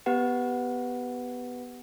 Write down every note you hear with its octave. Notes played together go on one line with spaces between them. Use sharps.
B3 G4 B4 F#5